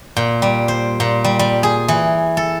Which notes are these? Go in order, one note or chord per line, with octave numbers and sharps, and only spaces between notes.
A#2
G3
C5
A#2
G3
G3
G#4
E3
A4